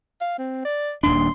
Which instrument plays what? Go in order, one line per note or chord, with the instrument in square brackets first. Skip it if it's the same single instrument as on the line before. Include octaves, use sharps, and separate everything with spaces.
[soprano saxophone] F5
C4
D5
[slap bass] D#1 D#2 D4 [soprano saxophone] C6